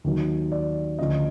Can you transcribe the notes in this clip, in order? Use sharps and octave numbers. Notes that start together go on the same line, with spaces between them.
D#2 D#3 F#3
D5
D2 C#3 F3 D#5